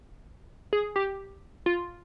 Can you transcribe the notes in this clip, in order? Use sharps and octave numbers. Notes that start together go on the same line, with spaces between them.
G#4
G4
F4